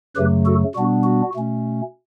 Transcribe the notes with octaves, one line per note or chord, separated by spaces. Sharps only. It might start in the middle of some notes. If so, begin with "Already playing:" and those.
F#2 C#3 F#3 A3 G4 B4
F#4 A4
B2 G3 B3 D4 F#4
F#4
B2 A3 C#4